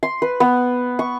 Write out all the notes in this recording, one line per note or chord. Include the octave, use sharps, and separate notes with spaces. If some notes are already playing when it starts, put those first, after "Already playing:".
C6
B4
B3
C#6